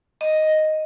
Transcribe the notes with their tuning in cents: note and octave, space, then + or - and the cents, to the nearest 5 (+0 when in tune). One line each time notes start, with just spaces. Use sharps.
D#5 +0